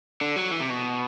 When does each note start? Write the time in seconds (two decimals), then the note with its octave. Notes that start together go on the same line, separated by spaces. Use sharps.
0.21 D3
0.36 F#3
0.51 E3
0.60 C3
0.70 B2